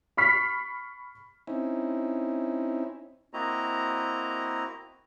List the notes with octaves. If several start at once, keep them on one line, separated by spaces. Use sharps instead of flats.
B5 C#6 F6 B6 C7
C4 C#4 D#4 E4
A#3 C4 E4 F#4 D#5 A#5